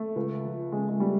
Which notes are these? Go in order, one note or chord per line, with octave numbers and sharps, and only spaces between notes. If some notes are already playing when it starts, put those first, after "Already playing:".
Already playing: A3
C#2
F3
C#3 G#3
G#3
G3